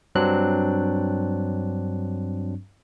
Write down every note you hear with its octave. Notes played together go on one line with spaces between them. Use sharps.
G2 F#3 C4 D4 F#6